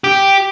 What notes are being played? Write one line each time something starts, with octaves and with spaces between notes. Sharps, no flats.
G4